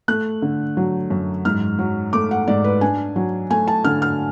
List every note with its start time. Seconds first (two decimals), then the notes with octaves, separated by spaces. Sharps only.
0.08 A3 F#6
0.42 D3
0.77 F#3
1.10 F#2
1.45 G#2 F6
1.79 F#3
2.13 A3 D6
2.31 F#5
2.48 G#2 D5
2.64 B4
2.81 D4 G#5
3.16 F#3
3.50 A3 G#5
3.68 A5
3.84 D3 F6
4.02 F6